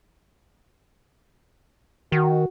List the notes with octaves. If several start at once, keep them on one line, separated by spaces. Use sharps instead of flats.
D#3 F#4